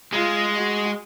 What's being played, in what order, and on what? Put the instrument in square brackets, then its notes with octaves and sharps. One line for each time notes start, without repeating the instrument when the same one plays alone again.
[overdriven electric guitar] G#3 [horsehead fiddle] F4
[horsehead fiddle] F#4